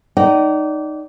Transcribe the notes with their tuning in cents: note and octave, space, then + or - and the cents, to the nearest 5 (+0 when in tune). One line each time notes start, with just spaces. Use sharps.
D#4 -10 D5 -20 G5 -45